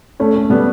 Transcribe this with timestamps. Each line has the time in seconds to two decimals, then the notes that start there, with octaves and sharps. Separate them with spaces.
0.20 A3 C#4
0.35 A3
0.50 G3 B3